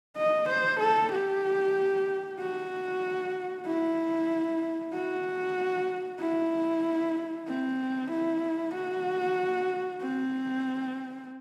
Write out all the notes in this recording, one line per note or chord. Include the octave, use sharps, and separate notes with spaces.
D#5
C5
A4
G4
F#4
E4
F#4
E4
C4
E4
F#4
C4